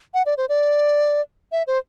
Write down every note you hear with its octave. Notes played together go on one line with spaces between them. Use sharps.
F#5
D5
C5
D5
E5
C5